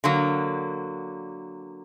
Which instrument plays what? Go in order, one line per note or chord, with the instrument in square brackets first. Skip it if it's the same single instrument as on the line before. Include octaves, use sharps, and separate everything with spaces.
[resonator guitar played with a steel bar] D3 F#3 A#3